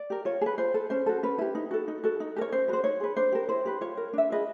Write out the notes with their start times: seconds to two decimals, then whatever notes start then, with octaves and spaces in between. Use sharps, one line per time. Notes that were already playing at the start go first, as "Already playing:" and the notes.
Already playing: D5
0.10 G4 A#4
0.25 F4 C#5
0.41 G#4
0.46 B4
0.58 F4 C5
0.74 A4
0.90 C#4 C5
1.06 F#4 A4
1.23 C#4 B4
1.38 E4 G4
1.55 D#4
1.71 F#4 A4
1.88 D#4
2.04 F#4 A4
2.20 D#4
2.36 G4 A#4 C#5
2.52 C#4 C5
2.68 F#4 B4 C5
2.84 D#4 C#5
3.00 G#4 B4
3.17 D4 C5
3.32 G4 A#4
3.49 E4 C5
3.65 G4 B4
3.81 F4 C#5
3.97 A#4
4.13 D4 E5
4.30 F4 G#4 B4 D#5